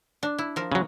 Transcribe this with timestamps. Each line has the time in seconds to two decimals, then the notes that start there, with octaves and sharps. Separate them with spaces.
0.23 D4
0.38 E4
0.56 F3 A#4
0.72 C#3 F#3